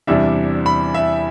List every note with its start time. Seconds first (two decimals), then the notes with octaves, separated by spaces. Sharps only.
0.07 E2 C3 E3 G3 D4 E5
0.66 B5
0.94 E5